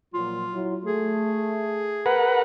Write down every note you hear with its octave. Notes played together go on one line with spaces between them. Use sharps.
A#2 F3 F#3 F4
F#3 E4
A3 G#4
A#4 B4 F#5